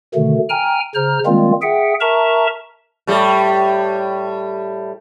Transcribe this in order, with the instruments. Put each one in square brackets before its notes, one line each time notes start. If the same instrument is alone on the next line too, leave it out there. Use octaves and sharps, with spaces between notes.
[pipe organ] B2 D3 D#3 A3
G5 G#5 A#5 F6
C#3 C5 A#5 F6
D#3 G3 G#3 A#3 C4 F4
G#4 E5 F#5 G5
A#4 E5 A5 A#5 C#6
[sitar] A2 G3